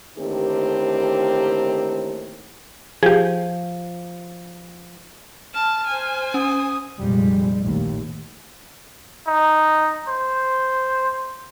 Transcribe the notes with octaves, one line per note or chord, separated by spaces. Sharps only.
A2 D3 D#3 A#3 C4 G4
F3 G4 G#4
A5 F6
C5 G#5
C#4 D#6
F1 F2 A#2 G3 G#3
A#1 D#2 A2
D#4
C5